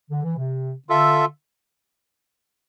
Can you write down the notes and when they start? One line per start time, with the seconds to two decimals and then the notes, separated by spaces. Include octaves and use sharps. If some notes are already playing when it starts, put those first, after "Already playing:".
0.11 D3
0.23 E3
0.37 C3
0.88 D3 F4 A4 E5